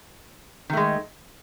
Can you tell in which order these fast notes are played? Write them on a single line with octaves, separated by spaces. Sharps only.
D#3 A3 G#3